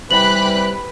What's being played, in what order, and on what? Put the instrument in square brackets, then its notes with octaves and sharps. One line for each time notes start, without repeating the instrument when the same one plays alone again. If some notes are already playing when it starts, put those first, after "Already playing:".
[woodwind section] C3 E3 G3 [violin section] G4 B5 F#6 [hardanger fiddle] B4 [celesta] F#7